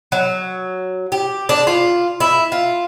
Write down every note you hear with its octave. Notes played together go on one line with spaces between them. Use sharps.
F#3
G4
D4
F4
E4
F4